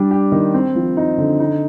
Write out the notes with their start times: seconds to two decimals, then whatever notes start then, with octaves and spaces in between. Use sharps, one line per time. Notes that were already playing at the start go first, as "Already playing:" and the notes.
Already playing: G3 D4
0.11 G4
0.32 D#3
0.54 C4
0.75 F3
0.97 D#4
1.18 D3
1.39 D#4